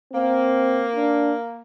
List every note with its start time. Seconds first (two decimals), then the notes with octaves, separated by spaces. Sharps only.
0.13 A#3 C4
0.96 D4